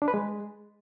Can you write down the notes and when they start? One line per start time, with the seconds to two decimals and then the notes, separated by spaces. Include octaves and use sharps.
0.02 D4
0.08 B4
0.14 G#3